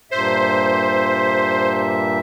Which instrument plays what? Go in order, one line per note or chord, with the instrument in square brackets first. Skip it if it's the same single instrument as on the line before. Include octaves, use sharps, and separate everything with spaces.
[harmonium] G2 A#2 E5 [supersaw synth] C5